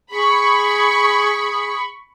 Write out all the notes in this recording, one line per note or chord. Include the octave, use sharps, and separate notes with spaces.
G#4 B5 C#6